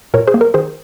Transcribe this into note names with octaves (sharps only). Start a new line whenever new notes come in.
A#2 A#4 C#5
G#4 C5
A#3
A#4
D#3 G#4 C5